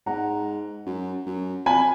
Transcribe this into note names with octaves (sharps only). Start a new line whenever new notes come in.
G#2 F#5 A#5
F#2
F#2
F2 G#5 B5